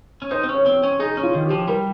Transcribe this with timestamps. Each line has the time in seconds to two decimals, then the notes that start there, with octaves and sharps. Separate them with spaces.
0.22 C#4
0.31 D#4 C5
0.43 C4
0.49 C#4
0.55 C#5
0.66 C4
0.83 C#4
0.99 D#4 G#4
1.17 C#4
1.23 F4
1.35 D#3
1.45 G4
1.51 F3
1.68 G3 A#4